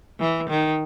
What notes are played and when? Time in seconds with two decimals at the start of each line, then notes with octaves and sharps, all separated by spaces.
0.20 E3
0.50 D#3